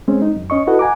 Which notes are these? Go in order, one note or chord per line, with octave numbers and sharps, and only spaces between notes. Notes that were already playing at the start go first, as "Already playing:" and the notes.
G#3 C4 C#4 C5
D#4
F#2
C#4 D#5 C#6
E4 F#4 A4 B4 D#5 F#5
F#5 G#5 A#5 D6